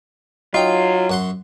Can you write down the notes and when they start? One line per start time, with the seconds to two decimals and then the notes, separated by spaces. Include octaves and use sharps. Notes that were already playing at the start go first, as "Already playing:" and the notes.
0.54 F#3 D#4 F4 G5
1.10 F#2 F#5 C6